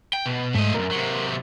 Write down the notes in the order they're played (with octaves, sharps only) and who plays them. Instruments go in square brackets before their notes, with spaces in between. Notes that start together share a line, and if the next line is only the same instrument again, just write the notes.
[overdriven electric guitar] G5
B2
[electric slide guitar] G#2 [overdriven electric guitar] A3 D#5
[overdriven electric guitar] B1 F#2 [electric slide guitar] A#4
[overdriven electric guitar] C3 F#3